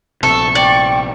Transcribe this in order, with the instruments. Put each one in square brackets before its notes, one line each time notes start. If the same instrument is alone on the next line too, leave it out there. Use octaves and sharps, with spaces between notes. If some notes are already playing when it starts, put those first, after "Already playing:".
[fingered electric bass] A#1 C3 [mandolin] A4 E6 [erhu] C#6
[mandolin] D5 [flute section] G5